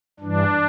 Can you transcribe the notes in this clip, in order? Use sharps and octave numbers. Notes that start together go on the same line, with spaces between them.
G2 E3 D4